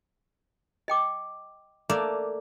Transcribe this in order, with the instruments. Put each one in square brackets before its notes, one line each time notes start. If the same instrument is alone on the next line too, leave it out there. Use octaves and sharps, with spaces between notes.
[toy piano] D#5 G5 D6
[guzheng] A3 A#3 D5